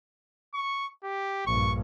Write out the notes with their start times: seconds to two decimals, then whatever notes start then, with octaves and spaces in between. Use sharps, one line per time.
0.54 C#6
1.04 G4
1.47 A#1 G2 C#6